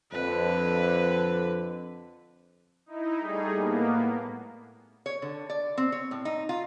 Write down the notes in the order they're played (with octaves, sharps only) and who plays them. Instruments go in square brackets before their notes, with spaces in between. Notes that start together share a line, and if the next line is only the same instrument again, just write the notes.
[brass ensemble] F2 D3 [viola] B4
[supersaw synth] D#4 E4
G3 A3 D#4 G#4
A2 A#3 B3
[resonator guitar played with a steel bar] C#5
D3
D5
C4
C#5
A2
D#4
F4